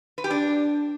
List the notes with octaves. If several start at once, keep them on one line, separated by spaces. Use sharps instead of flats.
B4
G4
D4